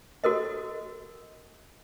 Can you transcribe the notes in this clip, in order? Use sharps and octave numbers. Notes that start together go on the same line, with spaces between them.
F#4 A4 A#4 D#5